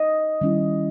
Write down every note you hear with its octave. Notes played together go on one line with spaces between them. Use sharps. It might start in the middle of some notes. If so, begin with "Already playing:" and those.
Already playing: D#5
D#3 G3 C#4 E4